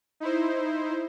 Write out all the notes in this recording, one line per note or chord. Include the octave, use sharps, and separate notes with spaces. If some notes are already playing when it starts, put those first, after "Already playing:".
D#4 E4 C5